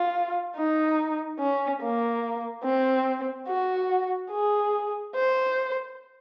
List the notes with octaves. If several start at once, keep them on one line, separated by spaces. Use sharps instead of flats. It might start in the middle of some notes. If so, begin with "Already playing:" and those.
Already playing: F4
D#4
C#4
A#3
C4
F#4
G#4
C5